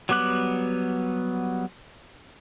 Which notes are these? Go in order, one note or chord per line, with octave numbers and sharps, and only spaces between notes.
F#3 G3 B3 D6 F#6